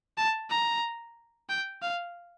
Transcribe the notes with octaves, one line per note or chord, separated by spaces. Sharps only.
A5
A#5
G5
F5